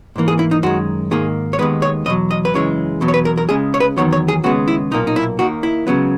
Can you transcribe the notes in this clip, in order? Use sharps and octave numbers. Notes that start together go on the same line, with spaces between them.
G#2 E3 A#3
G#4
E4
D#4
F#2 D#3 G#3 F#4
G#2 D#3 A#3 G#4
C#5
D#2 D#3 G#3 B3 B4
C#5
E2 B2 F#3 D#5
D#5
B4
F#2 C#3 E3 G#3 C#5
E2 B2 F#3
C#5
B4
A#4
A#4
C#2 C#3 G#3 G#4
C#5
B4
E2 D#3 F#3 B3 C#5
C#5
G#4
D#2 C#3 G#3 B3 F#4
E4
B1 A#2 A#3 D#4
D#4
E4
D#2 D#3 A#3 F#4
E4
C#2 C#3 F#3 B3